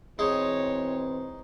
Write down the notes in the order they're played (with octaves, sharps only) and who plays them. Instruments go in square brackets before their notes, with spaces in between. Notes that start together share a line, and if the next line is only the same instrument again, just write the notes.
[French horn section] B2 E3 C4 [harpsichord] G#3 D#4 [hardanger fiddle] C#5